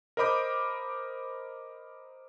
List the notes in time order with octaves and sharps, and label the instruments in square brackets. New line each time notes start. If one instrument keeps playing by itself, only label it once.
[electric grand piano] A#4 C5 D#5 B5 D6 G6